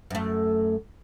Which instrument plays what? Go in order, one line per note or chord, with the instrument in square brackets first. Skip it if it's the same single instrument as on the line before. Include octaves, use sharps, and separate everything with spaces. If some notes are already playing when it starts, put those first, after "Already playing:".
[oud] F#2 A3